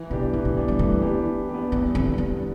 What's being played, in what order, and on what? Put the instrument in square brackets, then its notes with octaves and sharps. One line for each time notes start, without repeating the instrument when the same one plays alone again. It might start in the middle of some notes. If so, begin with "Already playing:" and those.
Already playing: [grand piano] E3
[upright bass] C3 [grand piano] B3 D4 G4
[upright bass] C3 [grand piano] E3
[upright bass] D3
[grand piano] B3 D4 G4
[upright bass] G3
[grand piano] E3 [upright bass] A3
[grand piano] B3 D4 G4
E3
B3 D4 G4
[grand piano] E2 [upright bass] B3
[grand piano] D3 G3 [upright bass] C4
[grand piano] E2 [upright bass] D4